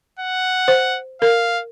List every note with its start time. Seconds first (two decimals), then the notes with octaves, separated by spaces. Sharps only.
0.20 F#5
0.68 C5
1.22 A#4 F5